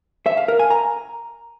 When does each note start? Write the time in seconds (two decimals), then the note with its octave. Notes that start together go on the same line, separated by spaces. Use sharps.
0.26 E5
0.37 F5
0.48 A#4
0.59 G#5
0.71 A#5